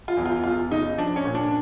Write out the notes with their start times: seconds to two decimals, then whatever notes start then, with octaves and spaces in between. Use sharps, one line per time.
0.08 F4
0.17 E2
0.26 F4
0.44 E2 F4
0.72 C#3 D#4
0.98 F3 D4
1.16 C#4
1.25 A#2
1.35 D4